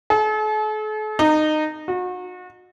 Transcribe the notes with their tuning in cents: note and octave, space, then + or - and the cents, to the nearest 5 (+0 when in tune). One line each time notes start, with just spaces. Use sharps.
A4 -45
D#4 -20
F#4 -35